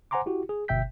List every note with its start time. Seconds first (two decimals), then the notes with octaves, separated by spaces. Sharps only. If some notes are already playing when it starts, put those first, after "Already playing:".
0.11 C5 F#5 G#5 A#5 C6 D6
0.26 E4 F#4 G4
0.49 G#4
0.68 G1 B2 E5 G5 G6 B6